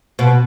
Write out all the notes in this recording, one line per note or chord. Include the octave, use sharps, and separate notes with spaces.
B2